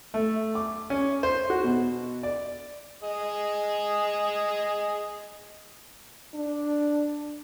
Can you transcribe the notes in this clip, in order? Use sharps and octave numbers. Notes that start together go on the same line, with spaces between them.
A3
D6
C#4
C5
F#4
B2
D5
G#4 D#5
D4